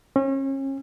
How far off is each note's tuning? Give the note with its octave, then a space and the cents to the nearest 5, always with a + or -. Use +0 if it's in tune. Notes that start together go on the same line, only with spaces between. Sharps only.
C#4 -35